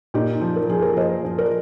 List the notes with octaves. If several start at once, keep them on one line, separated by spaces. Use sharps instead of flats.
A#2 D#4 G4
F3
A#4
F3 G#4
G4 A#4
F3 C5 D#5
F3
A#4 D5